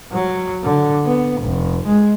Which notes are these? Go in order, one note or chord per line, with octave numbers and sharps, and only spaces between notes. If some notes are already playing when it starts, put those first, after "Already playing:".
F#3
D3
B3
F1
G#3